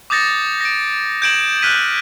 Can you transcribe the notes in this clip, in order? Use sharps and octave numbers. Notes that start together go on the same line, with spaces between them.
D6 D#6 G6 A6 A#6 C#7
A#6 D7
G6 G#6 D7 E7 F#7
F6 F#6 G#6 B6 D#7